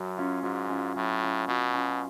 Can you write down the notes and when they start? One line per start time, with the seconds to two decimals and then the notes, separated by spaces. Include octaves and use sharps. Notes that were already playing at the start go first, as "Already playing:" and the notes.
Already playing: F#2 F#3
0.17 C#4 F4
0.43 G#2 F#3
0.70 C#4 F4
0.96 A2 F#3
1.22 C#4 F4
1.47 B2 F#3
1.74 C#4 F4